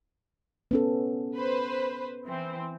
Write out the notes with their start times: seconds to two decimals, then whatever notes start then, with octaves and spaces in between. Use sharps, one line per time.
0.71 B3 C#4 A4
1.36 B4 C5
2.26 E3 C4